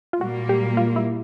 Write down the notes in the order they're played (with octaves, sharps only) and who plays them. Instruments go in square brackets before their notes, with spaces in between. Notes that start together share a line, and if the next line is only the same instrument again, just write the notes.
[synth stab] F4
[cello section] A#2 G3 A#3 [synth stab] F#4
[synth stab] G4
F4
E4